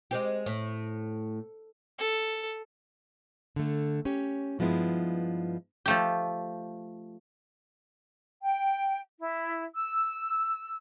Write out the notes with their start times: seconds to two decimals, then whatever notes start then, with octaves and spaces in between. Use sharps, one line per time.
0.11 G#3 C4 G4
0.46 A2
1.98 A4
3.56 D3 A3
4.05 C#4 G4 C#5
4.59 G2 F3 G#3 B3 E4
5.86 F3 A3 G4
8.42 G5
9.19 E4
9.74 E6